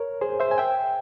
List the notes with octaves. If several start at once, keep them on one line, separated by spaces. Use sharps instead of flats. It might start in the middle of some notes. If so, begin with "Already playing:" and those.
Already playing: A#4 C#5
G#4 C5
C5 E5
G#5
E5 G5